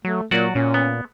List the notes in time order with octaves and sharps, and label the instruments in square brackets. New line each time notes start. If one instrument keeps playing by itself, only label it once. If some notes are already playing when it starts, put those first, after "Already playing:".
[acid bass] F#3 [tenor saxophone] A3
[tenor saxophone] A#2 [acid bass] F#3 [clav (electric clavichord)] F#4 D5
[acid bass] A#2 [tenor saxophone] C#4
[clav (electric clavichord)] B3